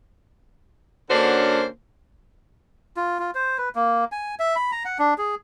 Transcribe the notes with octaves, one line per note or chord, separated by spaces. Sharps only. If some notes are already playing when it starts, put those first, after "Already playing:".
D3 A#3 C#4 D4 F#4 C5
F4
F4
C5
B4
A#3
G#5
E5
B5
A#5
F#5
D4
G#4